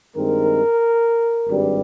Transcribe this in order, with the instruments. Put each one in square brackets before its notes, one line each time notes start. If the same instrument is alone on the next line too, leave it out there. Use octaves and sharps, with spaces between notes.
[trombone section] G2 D#3 G#3 C4 A#4
G#1 G2 G3